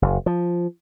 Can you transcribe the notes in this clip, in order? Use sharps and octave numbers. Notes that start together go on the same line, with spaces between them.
F#1
F3